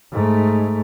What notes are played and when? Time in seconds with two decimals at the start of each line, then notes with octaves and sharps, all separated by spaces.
0.12 G#2 A3